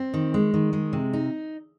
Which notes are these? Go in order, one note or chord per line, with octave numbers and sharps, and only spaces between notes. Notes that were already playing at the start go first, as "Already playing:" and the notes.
Already playing: C4
D#3
G#3
D#3
G#3
C3
D#4